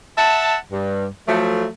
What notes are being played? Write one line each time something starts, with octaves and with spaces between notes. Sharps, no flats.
E5 F#5 A5
G2
F3 F#3 A3